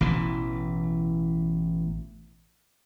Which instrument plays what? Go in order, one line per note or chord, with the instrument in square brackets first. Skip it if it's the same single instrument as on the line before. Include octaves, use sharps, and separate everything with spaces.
[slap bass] A1 B2 E3